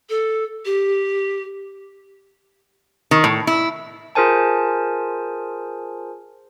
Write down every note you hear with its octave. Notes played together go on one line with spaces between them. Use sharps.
A4
G4
D#3
A2
E4
F4 G#4 A#4 C5 G#5 A5